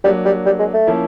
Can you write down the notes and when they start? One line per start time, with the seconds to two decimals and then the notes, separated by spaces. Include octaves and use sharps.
0.04 F#3 G3 A#3 D4
0.25 G3
0.46 G3
0.59 G#3
0.73 A3
0.87 F3 A#3 C#4 E4